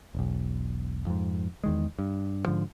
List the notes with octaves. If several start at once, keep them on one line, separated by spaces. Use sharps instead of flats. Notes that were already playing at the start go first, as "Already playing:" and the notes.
E1 B1
F2 G#2
E2 D#3 G#3
G2
G#2 D3 F3